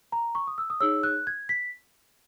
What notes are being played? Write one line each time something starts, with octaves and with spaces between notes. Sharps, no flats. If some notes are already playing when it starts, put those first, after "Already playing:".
A#5
C#6
D#6
E6
D#6
D#4 G#4 C#5 E6
F#6
G#6
B6